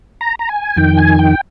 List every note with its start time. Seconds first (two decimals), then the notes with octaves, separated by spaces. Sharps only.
0.21 A#5
0.39 A#5
0.49 G#5
0.76 F2 D#3 G5
0.98 G#5
1.19 G5